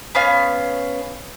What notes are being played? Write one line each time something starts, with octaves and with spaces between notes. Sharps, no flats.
B3 C#4 F5